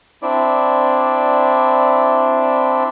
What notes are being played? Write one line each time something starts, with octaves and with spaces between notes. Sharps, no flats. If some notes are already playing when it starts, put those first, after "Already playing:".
C4 D4 E4 D5